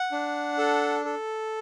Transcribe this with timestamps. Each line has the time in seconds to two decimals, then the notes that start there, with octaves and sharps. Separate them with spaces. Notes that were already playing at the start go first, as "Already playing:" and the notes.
Already playing: F#5
0.12 D4
0.58 A4
1.05 A4